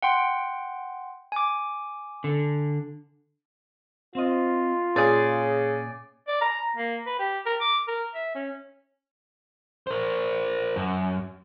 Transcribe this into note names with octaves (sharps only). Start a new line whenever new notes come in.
F#5 G5 C6
G#5 D6
D3
C4 F4 C5 D#5
A#2 C#3 G#4 D5
D5
A#5
A#3
B4
G4
A#4
D6
A#4
E5
C#4
A#4 C5
F#2